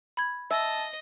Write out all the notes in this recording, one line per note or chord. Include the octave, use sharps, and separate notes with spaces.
B5 G#6
D#5 E5 A5